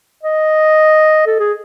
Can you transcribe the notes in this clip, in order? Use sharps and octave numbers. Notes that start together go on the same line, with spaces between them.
D#5
A4
G#4